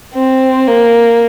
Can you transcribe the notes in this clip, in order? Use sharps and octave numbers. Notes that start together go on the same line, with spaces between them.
C4
A#3